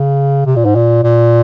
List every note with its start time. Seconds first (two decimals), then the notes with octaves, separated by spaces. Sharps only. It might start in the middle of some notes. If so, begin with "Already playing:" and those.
Already playing: C#3
0.46 C3
0.56 A#2
0.65 G#2
0.75 A#2
1.04 A#2